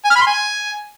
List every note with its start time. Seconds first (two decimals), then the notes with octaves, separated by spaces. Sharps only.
0.04 G#5
0.10 F6
0.16 B5
0.21 C6
0.27 G#5